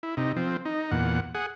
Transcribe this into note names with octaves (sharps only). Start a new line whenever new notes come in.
E4
C3 D#4
F3 C4
D#4
E2 A#2 F#5
G#4 F#5